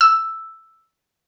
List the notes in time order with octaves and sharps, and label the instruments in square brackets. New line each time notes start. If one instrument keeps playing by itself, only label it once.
[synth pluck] E6